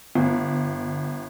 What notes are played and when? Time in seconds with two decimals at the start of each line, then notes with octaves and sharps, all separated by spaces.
0.15 G1